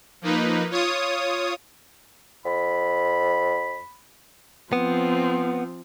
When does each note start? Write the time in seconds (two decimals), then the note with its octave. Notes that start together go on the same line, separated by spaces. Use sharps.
0.21 F3 A#3 D#4 B4
0.70 F4 C#5 D#6
2.45 F2 B5
4.73 F3 B3 C4